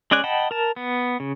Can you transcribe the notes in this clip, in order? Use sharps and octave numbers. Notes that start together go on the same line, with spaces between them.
G#3 C#4 D5 G#5 F#6
D#5 F#5 G5 A5 B5
A#4 A5
B3
C#3